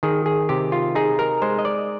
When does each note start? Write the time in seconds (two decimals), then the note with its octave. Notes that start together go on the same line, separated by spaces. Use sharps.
0.03 D#3 G#4
0.26 G#4
0.49 C3 G4
0.72 F4
0.95 D#4 G#4
1.19 A#4
1.42 G#3 C5
1.59 D#5
1.65 D5